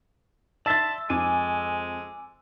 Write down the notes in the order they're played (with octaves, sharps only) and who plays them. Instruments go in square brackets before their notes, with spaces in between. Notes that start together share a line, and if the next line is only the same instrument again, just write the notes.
[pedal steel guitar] D5 E5 C6 [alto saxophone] A5 [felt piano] E6 A6
[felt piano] F2 [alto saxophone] G#3 [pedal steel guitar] G#5 D6